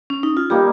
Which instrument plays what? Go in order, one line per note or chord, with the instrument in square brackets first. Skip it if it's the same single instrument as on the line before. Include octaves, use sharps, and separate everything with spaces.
[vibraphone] C#4
D#4
F4
[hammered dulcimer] G3 A#3 D#4 [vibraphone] G4